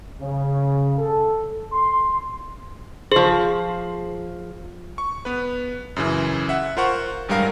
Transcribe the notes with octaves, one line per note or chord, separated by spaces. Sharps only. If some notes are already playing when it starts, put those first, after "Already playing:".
C#3
A4
C6
F3 G#4 C5
C#6
B3 B4
F#2 C#3 E3
E5 F#5
F4 A#4 C5 F#5 C#6
A1 G2 G3 G#3 A#4 F5